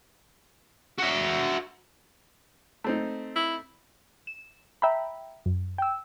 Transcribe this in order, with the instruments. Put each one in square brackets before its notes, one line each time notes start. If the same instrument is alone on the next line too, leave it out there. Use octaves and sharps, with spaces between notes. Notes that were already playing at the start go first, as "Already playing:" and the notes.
[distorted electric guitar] F#4 E5
[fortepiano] A3 C4 D#4
[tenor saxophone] E4
[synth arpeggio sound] E7
E5 G5 A#5 B5
F#2
G5 E6